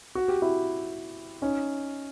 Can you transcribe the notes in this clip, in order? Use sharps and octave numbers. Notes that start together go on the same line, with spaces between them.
F#4
G4
E4 F#4
C#4 D#4